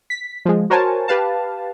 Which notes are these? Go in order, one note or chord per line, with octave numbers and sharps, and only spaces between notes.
B6
F3 G#3
F#4 A#4 C5 C#5 G#5 A5
G4 B4 F5 A5